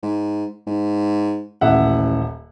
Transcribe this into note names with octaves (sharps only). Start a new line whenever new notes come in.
G#2
G#2
D#1 A1 E5 F#5